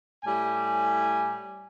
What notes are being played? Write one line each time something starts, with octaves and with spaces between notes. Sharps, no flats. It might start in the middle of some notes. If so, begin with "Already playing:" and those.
A2 G3 G#5